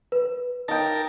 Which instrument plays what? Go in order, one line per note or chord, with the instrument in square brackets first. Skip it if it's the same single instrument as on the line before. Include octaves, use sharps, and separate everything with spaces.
[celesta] B4
[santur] D#4 G5 [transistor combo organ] A#4 A5